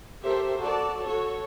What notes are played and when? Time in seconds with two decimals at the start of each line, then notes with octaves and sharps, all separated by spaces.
0.25 G4 A4 A#4 C5 E5
0.63 F#4 A4 D5 A5
1.05 F#4 A4 C#5